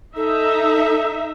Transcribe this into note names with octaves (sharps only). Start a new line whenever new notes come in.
D#4 A4 E5